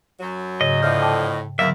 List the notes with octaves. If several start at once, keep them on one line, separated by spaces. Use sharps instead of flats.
F#2 F#3
G#2 C#3 D#5
A2 D3 F3 E5 F6 G6
G5 A5 D6
E2 D3 F#3 A#3 A#4 E5